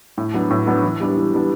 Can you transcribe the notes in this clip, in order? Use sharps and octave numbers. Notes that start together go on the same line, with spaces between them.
A2
F#3 B3 D4
A2
F#3 B3 D4
E3
G3 B3 D4
E3
G3 B3 D4